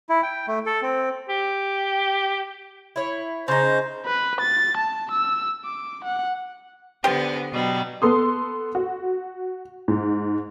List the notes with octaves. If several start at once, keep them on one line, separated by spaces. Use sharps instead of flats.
E4
G5
A3
A4
C4
G4
E4 C#5
C#3 D#4 C5
B4
A6
A5
E6
D6
F#5
D3 B3 G4 C5 D5
B2 F#3 G3
B3 A4 C6 D#6
F#4
G#2